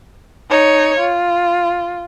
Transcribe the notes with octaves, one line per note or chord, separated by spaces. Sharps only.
D#4 C#5
F4